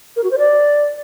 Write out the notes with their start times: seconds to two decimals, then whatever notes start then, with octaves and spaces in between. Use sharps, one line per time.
0.16 A#4
0.24 F#4
0.31 C5
0.38 D5